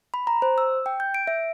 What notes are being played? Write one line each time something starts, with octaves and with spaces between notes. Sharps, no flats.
B5
A#5
C5
E6
G5
G6
D7
E5